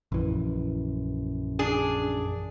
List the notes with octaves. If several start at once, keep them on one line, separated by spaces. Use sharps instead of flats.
A#1 F#2 E3
D4 G#4